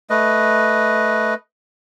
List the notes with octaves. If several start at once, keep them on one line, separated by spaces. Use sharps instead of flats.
A3 B4 D#5